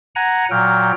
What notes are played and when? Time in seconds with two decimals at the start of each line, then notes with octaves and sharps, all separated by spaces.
0.16 F#5 G#5 A#5
0.51 A#2 F#3 G5 F6